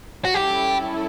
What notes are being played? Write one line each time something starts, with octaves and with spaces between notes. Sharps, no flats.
F#4
G3 C#4 E4 G4 A4